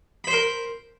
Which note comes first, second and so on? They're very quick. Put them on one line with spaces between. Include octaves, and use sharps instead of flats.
B5 C5 C6 A#4